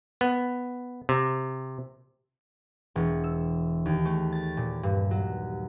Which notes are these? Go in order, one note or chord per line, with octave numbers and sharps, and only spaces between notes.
B3
C3
E1
E6
D#2
A3
A6
A#2
G2
F#3